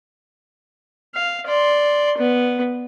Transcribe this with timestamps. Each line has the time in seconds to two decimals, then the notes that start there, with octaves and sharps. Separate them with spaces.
1.14 F5
1.47 D5 C6
2.18 B3